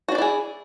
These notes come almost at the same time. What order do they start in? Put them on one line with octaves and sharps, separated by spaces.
F#4 D4 D5 E4 G#4